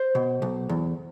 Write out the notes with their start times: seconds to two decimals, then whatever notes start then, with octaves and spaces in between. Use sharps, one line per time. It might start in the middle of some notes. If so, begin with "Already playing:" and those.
Already playing: C5
0.15 B2
0.42 B1
0.69 E2